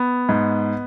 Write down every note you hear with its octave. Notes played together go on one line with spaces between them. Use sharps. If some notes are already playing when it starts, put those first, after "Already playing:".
Already playing: B3
G#2